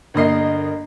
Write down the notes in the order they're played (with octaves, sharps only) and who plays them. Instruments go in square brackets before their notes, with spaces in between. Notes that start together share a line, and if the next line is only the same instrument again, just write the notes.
[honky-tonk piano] G1 A#3 D#5 C7